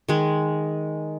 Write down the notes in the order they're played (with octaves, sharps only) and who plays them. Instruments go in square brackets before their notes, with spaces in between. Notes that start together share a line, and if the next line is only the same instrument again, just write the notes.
[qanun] D#3 G#3